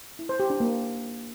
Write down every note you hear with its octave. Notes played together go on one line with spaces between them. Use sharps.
E4
C5
G4
D4
A#3